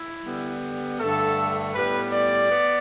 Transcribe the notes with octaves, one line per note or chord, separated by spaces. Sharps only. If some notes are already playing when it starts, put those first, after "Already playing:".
Already playing: E4
D3 G3 B3
G2 D3 A3 A4
A2 G3 B3 B4
D5
B3